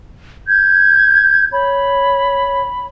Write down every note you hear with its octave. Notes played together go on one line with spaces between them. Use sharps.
G6 G#6
C#5 B5